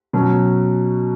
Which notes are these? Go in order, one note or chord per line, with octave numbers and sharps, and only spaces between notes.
B2 F#3 C#4